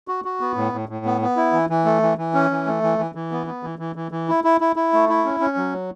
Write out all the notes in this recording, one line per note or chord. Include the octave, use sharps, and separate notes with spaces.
F#4
F#4
B3
A2
A2
A2
B3
B3
E4
E3
E3
A3
E3
E3
C#4
E3
A3
E3
E3
E3
B3
B3
E3
E3
E3
E3
E4
E4
E4
E4
A3
E4
C#4
C#4
F#3